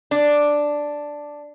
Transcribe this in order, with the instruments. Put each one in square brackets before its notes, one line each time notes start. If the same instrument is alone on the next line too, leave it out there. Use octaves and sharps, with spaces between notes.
[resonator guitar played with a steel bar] D4